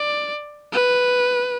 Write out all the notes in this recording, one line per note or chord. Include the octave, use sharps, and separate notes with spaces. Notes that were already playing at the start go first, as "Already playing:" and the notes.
Already playing: D5
B4